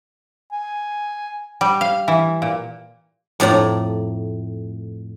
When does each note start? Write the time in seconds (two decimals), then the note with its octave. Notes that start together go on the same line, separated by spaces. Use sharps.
0.52 G#5
1.61 G3
1.81 F5
2.08 E3
2.42 A#2
3.40 F2 A2 D5 A#5